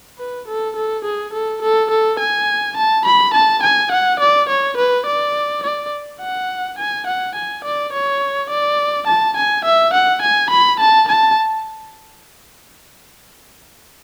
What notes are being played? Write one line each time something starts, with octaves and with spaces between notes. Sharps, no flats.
B4
A4
A4
G#4
A4
A4
A4
G#5
A5
B5
A5
G#5
F#5
D5
C#5
B4
D5
D5
F#5
G#5
F#5
G#5
D5
C#5
D5
A5
G#5
E5
F#5
G#5
B5
A5
A5